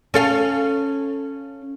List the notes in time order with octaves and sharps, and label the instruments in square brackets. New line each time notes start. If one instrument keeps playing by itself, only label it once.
[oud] C#4 A4 F5